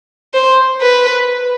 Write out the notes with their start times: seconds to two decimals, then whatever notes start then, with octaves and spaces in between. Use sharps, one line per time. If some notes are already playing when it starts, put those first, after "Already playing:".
0.34 C5
0.81 B4